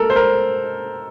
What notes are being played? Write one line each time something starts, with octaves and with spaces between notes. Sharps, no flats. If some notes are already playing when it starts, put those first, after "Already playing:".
Already playing: A4 A#4
C5
A#4